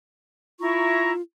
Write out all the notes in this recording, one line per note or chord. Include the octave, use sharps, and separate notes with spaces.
E4 F4 A#5 C#6